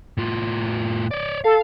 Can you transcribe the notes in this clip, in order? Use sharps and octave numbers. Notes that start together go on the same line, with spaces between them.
A2 F4
C#5 D5
A4 F5